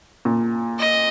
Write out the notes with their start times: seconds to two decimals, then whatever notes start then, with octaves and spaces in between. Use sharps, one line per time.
0.25 A#2
0.79 D#5